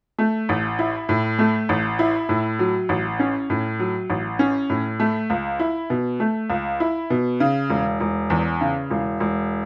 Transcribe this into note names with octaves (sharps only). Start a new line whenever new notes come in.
A3
A1
E4
A2
A3
A1
E4
A2
F#3
A1
C#4
A2
F#3
A1
C#4
A2
A3
C#2
E4
B2
A3
C#2
E4
B2
C#3
E1
E1
E2
C#3
E1
E1